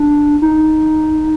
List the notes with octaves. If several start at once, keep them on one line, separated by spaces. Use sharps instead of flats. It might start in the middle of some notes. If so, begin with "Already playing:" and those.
Already playing: D4
D#4